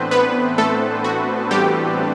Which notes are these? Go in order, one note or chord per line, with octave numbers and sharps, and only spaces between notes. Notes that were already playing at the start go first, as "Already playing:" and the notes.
Already playing: A2 E3 A3 B3 C4 D4 B4 C5
B3 B4
A3 A4
F#4
G3 G4